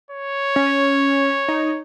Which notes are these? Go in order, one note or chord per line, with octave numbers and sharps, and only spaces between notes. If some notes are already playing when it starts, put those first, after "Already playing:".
C#5
C#4
D#4